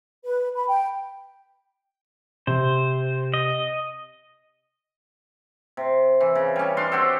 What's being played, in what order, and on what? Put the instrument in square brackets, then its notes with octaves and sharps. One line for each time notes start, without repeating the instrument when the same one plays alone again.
[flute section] B4
B5
G5
[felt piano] C3 [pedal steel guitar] C5
[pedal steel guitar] D#5
[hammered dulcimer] C3
E3
C#3
G3 C#4
D4 F5 C6
C4 F#4 G4 A4